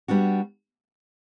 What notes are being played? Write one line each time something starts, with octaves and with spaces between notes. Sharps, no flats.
G3 B3 D4 F#4